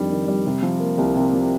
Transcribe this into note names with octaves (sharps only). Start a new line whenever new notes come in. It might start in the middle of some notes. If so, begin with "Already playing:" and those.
Already playing: F2 D#3 G3 D4
D#3
G3
C3
F3
A#3
C2
C3
F3